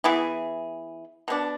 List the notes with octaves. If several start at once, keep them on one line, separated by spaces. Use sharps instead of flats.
E3 B3 E4 G#4
B2 B3 D4